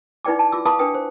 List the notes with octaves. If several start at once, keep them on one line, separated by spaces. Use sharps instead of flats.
D#4 E4 B4 D5 G5 D6
A5
F4 D6 E6
B4 F5 A5 B5 D6 D#6
D4 B4 G5 D#6
C5